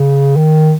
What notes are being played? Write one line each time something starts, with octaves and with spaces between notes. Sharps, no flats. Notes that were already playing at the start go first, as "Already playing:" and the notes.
Already playing: C#3
D#3